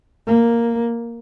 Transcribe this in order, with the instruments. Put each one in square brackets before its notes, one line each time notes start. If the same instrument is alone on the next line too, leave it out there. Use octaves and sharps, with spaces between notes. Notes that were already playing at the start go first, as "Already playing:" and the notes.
[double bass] A#3